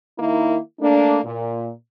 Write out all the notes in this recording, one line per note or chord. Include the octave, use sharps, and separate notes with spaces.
D#3 A#3 D#4 E4
A3 A#3 D4
A#2